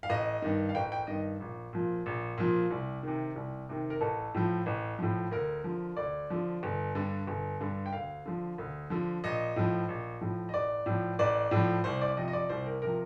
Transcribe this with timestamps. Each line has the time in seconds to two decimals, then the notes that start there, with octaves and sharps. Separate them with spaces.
0.03 F5
0.09 A1 D#5
0.42 G2 D#3
0.69 F5
0.75 A1 G5
0.92 G5
1.07 G2 D#3 D#5
1.40 A#1
1.73 A#2 F3
2.06 A#1
2.38 A#2 F3
2.70 C2
3.03 C3 D#3
3.36 C2
3.69 C3 D#3
3.90 A#4
4.01 A1 A4
4.35 A2 F3
4.66 A1
4.99 A2 F3
5.31 D2 A#4
5.64 D3 F3
5.97 D2 D5
6.30 D3 F3
6.63 G1
6.95 G2 D3
7.27 G1
7.60 G2 D3
7.86 G5
7.93 D2 F5
8.26 D3 F3
8.58 D2
8.90 D3 F3
9.24 A#1 D#5
9.56 A2 F3
9.89 A#1
10.21 A2 F3
10.49 D#5
10.54 A1 D5
10.86 A2 F3
11.19 A1 D5
11.51 A2 F3
11.84 C2 C5
12.01 D5
12.17 C3 F3 D#5
12.28 D#5
12.33 D5
12.49 C2 C5
12.66 A#4
12.82 C3 F3 A#4